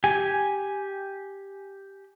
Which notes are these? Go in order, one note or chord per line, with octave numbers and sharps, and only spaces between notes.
G4 G#5